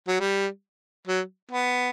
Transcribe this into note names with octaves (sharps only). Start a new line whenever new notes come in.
F#3
G3
F#3
B3